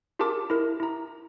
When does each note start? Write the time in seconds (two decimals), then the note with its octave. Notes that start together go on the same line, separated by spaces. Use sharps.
0.19 F4 G4 G#4 A#4 A5 D6
0.50 E4 A#4
0.80 E4 A#5